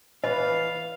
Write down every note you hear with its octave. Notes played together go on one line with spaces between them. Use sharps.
E3 B4 D#5 F5